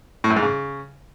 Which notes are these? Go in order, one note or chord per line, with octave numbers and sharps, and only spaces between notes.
A2
F#2
G#2
C#3